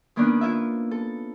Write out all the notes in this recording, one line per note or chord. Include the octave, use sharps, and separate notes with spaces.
D#3 A#3 B3 C#4 D4
E4 F4 E5
A4